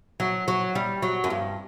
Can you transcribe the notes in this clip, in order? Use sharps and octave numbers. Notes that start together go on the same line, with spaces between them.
F#3
F#3
G3
F#3
F#2
G2